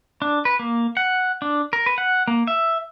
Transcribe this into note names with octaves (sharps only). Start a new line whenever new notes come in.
D4
B4
A#3
F#5
D4
A#4
B4
F#5
A#3
E5